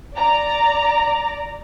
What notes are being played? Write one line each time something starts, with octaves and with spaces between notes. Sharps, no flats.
D5 A#5